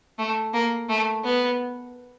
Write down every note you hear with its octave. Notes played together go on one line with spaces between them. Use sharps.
A3
A#3
A3
B3